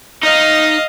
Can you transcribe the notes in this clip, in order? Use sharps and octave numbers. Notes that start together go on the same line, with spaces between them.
D#4 D#5 F5